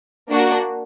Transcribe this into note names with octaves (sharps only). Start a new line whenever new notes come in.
A#3 D4 F#4